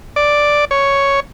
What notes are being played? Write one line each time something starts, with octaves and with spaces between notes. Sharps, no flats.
D5
C#5